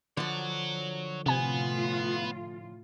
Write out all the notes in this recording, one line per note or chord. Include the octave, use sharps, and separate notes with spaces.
D3 F3 C#5 F#5
A2 C3 B3 F4 G#5